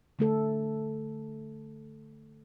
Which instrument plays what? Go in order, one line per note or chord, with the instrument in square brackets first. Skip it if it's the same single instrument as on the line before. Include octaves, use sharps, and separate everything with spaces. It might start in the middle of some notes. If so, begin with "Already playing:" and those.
[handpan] D3 A3 A4